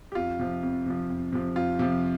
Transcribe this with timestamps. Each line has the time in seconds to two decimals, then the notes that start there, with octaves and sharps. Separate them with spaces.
0.12 G4
0.15 F2 F4
0.39 C3 F3
0.63 F2
0.86 C3 F3
1.10 F2
1.32 C3 F3
1.56 F2 F4
1.79 C3 F3